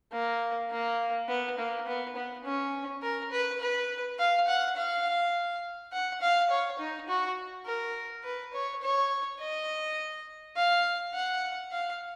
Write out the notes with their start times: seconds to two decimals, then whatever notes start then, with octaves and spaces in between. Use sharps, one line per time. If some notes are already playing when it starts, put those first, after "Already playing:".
0.12 A#3
0.71 A#3
1.28 B3
1.58 A#3
1.87 B3
2.16 B3
2.44 C#4
3.02 A#4
3.31 B4
3.60 B4
4.19 F5
4.48 F#5
4.76 F5
5.92 F#5
6.21 F5
6.50 C#5
6.79 D#4
7.08 F#4
7.66 A#4
8.24 B4
8.54 C#5
8.83 C#5
9.39 D#5
10.56 F5
11.14 F#5
11.71 F5